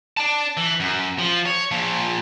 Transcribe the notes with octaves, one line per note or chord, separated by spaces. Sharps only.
D5 A5
E3
F#2
F3
C#5
A#2 F3